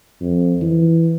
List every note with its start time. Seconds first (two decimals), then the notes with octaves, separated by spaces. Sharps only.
0.21 F2
0.62 E3